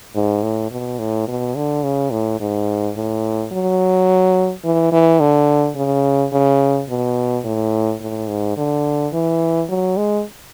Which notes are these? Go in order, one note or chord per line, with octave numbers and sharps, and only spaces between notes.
G#2
A2
B2
A2
B2
D3
C#3
A2
G#2
A2
F#3
E3
E3
D3
C#3
C#3
B2
A2
A2
G#2
D3
E3
F#3
G#3